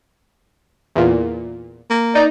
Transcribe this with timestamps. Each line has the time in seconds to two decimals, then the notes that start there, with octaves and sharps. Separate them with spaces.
0.96 E2 A#2
1.90 A#3
2.15 D#4 D5